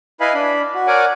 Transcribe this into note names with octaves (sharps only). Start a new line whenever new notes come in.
E4 B4 D#5 F5 G#5 B5
D4 B5
F#4
A#4 C#5 D5 F#5 G#5 D6